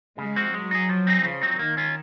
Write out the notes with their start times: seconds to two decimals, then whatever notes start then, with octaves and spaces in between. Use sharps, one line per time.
0.18 C#3 G#3
0.36 F3 C4 F#4
0.54 F#3 G#3
0.71 D#4 G#4
0.89 F3
1.07 C4 D#4 G#4
1.24 C#3 F3
1.42 F#3 C4 D#4
1.59 D#3 A#3
1.77 C#4 F4